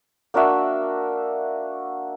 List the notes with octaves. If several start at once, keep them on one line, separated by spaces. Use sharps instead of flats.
A#3 D4 F#4 E5